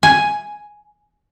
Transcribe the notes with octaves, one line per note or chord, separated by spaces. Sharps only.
G#5